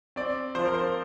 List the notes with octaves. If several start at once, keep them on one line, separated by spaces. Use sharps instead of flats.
C4 D5
F3 C5
A#4
C5